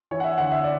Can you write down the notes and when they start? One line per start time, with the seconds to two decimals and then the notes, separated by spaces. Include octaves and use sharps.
0.11 E3 C#5
0.20 F#5
0.24 E5
0.38 D2 F#5
0.52 E5
0.64 D5